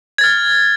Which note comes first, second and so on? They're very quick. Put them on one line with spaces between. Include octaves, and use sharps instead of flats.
G#6 A6 F6